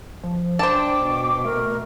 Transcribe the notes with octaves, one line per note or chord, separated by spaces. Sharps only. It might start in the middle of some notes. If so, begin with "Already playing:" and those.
F3
D4 C5 G5 A5 D6
B2
A3 A#4